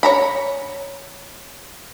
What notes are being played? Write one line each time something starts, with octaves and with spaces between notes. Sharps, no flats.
C#5 A#5 B5